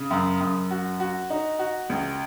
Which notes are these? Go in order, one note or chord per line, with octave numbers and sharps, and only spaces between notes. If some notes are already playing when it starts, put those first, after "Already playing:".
Already playing: C#3
F#2
F#2
F#4
F#4
D#4
F#4
C#2